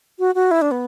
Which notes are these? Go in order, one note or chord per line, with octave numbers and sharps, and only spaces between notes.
F#4
F#4
E4
D4
B3